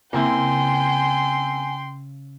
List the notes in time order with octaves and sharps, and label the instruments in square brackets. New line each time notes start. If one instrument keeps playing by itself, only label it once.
[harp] C#3 [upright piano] A#3 C4 E4 [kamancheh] G5 C6 [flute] G#5